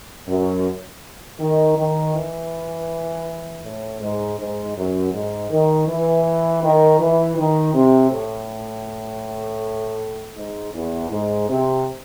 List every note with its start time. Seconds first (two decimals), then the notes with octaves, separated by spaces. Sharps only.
0.28 F#2
1.40 D#3
1.77 D#3
2.14 E3
3.65 A2
4.01 G#2
4.39 G#2
4.77 F#2
5.13 G#2
5.51 D#3
5.88 E3
6.63 D#3
7.00 E3
7.37 D#3
7.74 C3
8.12 A2
10.36 G#2
10.74 E2
11.11 G#2
11.49 C3